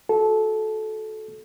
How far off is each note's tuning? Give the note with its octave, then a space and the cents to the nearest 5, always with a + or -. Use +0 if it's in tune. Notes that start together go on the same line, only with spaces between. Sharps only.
F#4 -10 A4 -20